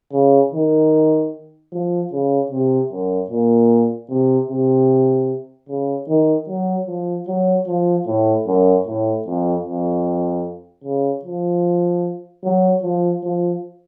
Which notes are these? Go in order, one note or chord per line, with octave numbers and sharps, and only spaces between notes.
C#3
D#3
F3
C#3
C3
F#2
A#2
C3
C3
C#3
D#3
F#3
F3
F#3
F3
A2
F#2
A2
F2
F2
C#3
F3
F#3
F3
F3